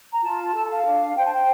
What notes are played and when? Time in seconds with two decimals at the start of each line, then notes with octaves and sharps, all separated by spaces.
0.12 A#5
0.22 F4 A5
0.54 A4
0.68 F5
0.84 D4
1.15 C5 G5
1.24 A5
1.32 G5